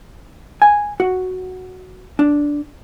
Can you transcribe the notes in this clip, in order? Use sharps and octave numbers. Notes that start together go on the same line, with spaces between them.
G#5
F#4
D4